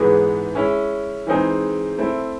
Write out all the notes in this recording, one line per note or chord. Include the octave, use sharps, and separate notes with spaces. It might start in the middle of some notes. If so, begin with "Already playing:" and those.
Already playing: G#2 E3 G#3 B3 D#4
G#3 C#4 E4
E3 G#3 C4 D#4 G#4
A3 C4 E4